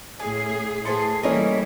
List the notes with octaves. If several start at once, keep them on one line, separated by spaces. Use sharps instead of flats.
A2 C#4 G#4 G#5
A2 G#4 A4 B4 C5 C6 C#7
E3 G3 A3 A#3 C#4 D#4 A#4 B4